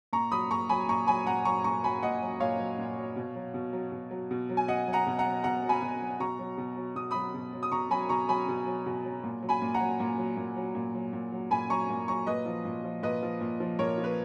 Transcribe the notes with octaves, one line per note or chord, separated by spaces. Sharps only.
A#2 A#5 C#6
F#3 B5 D#6
A#2 A#5 C#6
F#3 G#5 B5
A#2 A#5 C#6
F#3 G#5 B5
A#2 F#5 A#5
F#3 A#5 C#6
A#2 A#5 C#6
F#3 G#5 B5
A#2 D#5 F#5
F#3
A#2 C#5 F5
F#3
A#2
F#3
B2
F#3
B2
F#3
B2
F#3
B2
F#3
G#5
B2 D#5 F#5
F#3
F#5 A#5
B2
F#5 A#5
F#3
B2 F#5 A#5
F#3
G#5 B5
B2
F#3
B2 A#5 C#6
F#3
B2
F#3
B2 D#6
F#3 B5 D#6
B2
F#3
D#6
B2 A#5 C#6
F#3 G#5 B5
B2 A#5 C#6
F#3 G#5 B5
B2
F#3
B2
F#3
A#2
F#3
G#5 B5
A#2
F#5 A#5
F#3
A#2
F#3
A#2
F#3
A#2
F#3
A#2
F#3
A#2 G#5 B5
F#3 A#5 C#6
A#2
F#3 A#5 C#6
A#2 B4 D#5
F3
A#2
F3
A#2 B4 D#5
F3
A#2
F3
A#2 A#4 C#5
F3
B4